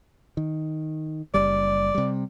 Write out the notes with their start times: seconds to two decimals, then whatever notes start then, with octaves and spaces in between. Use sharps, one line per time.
0.37 D#3
1.34 F#1 G3 D5
1.95 C3 G3